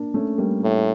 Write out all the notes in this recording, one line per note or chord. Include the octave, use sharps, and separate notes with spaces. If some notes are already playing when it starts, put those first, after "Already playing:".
Already playing: A#3 D4
A3 C#4
G3 A#3
A2